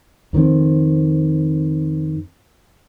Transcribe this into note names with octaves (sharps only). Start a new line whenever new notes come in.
F2 D#3 A#3 C4